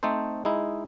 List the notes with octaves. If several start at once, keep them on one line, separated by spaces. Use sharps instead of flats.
A3 C4 D#4 A4 C5
G#3 D#4 E4